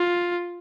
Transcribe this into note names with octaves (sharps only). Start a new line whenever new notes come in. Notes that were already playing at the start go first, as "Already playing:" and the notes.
Already playing: F4